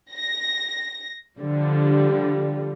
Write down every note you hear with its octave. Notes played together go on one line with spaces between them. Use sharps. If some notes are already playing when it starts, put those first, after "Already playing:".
A#6
D3 F3 G3